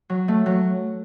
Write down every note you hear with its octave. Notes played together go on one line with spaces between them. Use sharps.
F#3
A3
F#3